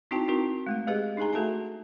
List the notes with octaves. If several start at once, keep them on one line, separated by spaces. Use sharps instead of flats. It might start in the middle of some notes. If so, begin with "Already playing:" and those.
C4 D#4 E4 F#4 G5 A5
C4 D#4 E4 F#4 A#4
G#3 A3 F5
G#3 G4 G#4 B4 D#5 F5
D4 D#4 G#4 G#5 A#5
A3 F#4 A4 E5 A5 A#5